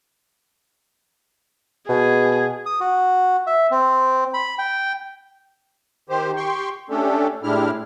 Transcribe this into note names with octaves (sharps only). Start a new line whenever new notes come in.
B2 G#4
D#6
F#4
E5
C4
B5
G5
D#3 G4 C5
G4 G5 C6 C#6
A3 C#4 D4 G4 A4
A2 G#3 D4 E4 G4 F6